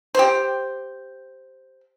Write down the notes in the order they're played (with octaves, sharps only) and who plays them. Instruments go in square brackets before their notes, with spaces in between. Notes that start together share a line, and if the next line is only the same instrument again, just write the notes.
[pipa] G4 C5